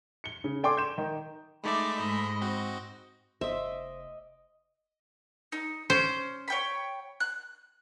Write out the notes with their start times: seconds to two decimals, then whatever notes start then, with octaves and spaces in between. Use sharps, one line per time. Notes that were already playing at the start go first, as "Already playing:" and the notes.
0.24 C#7 G7
0.44 C#3
0.63 A4 D5 G5 G#5 C6 D6
0.77 G6 E7
0.98 D#3
1.64 G#3 A3 D#4 D5 E5 B5
1.98 G#2 D#5
2.42 C4 F#4
3.41 F1 C5 D#5 E5 D6
5.52 D#4
5.90 C#4 C5
6.48 C#5 G5 B5
7.20 F#6